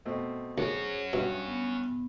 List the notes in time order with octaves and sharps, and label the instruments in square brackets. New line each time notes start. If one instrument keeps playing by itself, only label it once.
[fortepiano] B2 A3 C4
[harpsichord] D2 [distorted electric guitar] C#4 F#4 [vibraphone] G#4 C5 C#5
[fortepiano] G2 E5 [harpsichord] B2 [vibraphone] F5
[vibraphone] B3